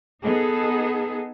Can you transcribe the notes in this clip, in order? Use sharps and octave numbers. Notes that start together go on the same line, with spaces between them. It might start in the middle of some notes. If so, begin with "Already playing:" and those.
B3 D#4 G#4 A4